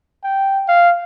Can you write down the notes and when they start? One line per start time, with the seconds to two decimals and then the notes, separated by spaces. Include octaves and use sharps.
0.24 G5
0.68 F5